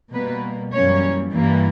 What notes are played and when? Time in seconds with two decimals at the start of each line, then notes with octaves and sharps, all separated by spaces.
0.13 B2 G3 A#3 B3 B4
0.72 F#2 E3 G3 A#3 C#4 C#5
1.32 G2 E3 G3 A#3